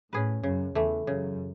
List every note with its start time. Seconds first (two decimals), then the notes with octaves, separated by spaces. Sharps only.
0.13 A2 C#4 G#4 B4
0.43 F#2 C#3
0.75 E2 E3 A3
1.07 F#2 C#3